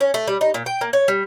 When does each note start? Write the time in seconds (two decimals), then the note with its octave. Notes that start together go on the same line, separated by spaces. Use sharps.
0.01 C#4
0.14 A3
0.28 G3
0.41 D#4
0.54 A#2
0.66 G5
0.81 A#3
0.93 C#5
1.08 G3